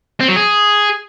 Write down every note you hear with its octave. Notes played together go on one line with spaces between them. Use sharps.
C4
F#3
G#4